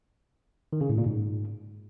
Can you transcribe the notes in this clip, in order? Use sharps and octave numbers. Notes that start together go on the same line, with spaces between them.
D#3
C#3
A2
A#2
G#2